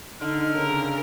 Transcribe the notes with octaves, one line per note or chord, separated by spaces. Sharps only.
D3 D#4 F6
C#3 A#4